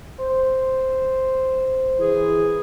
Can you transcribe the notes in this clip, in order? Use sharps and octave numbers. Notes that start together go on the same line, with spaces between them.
C5
E3 G#4